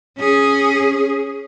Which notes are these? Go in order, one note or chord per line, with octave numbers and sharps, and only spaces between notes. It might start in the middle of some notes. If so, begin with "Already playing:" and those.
C#4 G#4